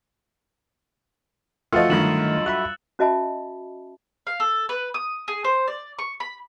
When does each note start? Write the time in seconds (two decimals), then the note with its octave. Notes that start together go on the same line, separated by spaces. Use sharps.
1.73 F3 A3 F4 F#4 D#5 E6 A6 C#7
1.90 G2 D3 D#3 F#3 A3 A6 E7 F#7
2.46 F#4 E5 B5 F#6
2.99 C#4 F#4 D#5 E5 A5 B5
4.27 F5
4.40 A4
4.69 B4
4.94 D#6
5.28 G#4
5.44 C5
5.68 D5
5.99 C#6
6.20 B5